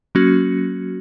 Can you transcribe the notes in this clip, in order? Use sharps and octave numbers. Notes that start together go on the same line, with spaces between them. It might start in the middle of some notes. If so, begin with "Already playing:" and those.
F#3 A#3 C#4 F#4